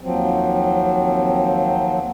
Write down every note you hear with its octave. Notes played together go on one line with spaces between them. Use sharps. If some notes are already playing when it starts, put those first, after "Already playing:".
D#2 F3 F#3 C4